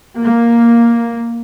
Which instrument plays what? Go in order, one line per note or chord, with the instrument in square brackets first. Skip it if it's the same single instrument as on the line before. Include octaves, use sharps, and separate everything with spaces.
[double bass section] A#3